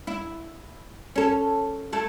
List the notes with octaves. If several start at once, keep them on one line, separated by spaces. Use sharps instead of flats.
E4
C#4 A4
A3 E4 A4